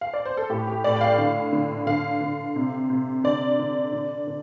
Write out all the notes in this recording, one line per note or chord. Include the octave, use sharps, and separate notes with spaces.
F5
D5
C5
A4
A2 G4
G4
A2 D5
G5
F5
D3
D3
D3 F5
D3
C3
C3
D3 D5
D3
D3
D3